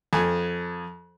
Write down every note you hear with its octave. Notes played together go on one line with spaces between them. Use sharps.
F2 G#5